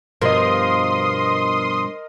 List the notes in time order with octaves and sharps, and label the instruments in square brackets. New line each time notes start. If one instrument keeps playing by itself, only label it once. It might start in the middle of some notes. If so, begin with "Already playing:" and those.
[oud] G2 B2 F3 [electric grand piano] A#4 D#5 [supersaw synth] C6 D#6